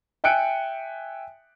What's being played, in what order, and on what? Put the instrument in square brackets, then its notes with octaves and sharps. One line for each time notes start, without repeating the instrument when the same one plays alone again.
[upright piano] E5 G5 G#5 F#6 C#7 D7